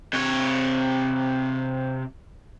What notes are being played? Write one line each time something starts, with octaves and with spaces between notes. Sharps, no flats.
C3 C#5